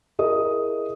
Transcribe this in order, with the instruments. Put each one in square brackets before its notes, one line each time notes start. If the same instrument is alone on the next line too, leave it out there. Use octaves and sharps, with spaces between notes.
[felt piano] E4 G#4 A#4 D#5 D#6